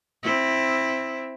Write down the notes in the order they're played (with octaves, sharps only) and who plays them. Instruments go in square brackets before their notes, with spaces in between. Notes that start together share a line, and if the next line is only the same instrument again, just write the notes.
[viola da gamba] C4 E4